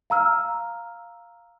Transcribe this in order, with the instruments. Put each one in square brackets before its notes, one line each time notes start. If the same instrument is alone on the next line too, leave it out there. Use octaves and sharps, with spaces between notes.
[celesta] F5 A#5 E6 F6